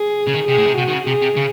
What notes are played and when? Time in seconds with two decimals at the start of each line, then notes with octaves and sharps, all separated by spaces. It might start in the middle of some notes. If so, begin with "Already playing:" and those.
Already playing: G#4
0.27 C#3
0.34 D#3
0.48 C3 G#4
0.58 A2
0.67 C3
0.78 C3 F#4
0.88 D#3
0.92 C#3
1.07 C3 G#4
1.22 C3
1.36 C#3